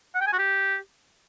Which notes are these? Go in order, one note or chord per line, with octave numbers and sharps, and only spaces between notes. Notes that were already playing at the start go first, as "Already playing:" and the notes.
F#5
G5
G#5
F#4
G4